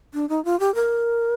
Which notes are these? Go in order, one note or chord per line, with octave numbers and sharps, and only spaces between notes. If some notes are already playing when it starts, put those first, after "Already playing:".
D4
D#4
F4
G4
A#4